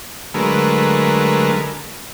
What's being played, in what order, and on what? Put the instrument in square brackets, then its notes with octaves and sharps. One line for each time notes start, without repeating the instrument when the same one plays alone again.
[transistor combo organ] D3 F#3 G#3 A3 A#4 B4